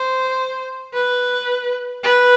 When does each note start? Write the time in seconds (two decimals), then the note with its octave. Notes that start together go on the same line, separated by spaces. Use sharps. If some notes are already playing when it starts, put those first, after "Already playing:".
Already playing: C5
0.94 B4
2.03 B4